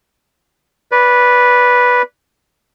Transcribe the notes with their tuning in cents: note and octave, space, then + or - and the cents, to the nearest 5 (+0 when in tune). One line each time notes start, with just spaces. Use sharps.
B4 -5 D5 -15